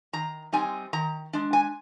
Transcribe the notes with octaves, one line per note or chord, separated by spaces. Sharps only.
D#3 A#5
G3 C4 D#4 G#5
D#3 A#5
G#3 D4
G#5